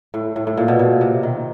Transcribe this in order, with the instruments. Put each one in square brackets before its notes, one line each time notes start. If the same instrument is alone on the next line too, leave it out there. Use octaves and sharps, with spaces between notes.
[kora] A2
A2
A2
A#2
B2
A#2
C3
D#3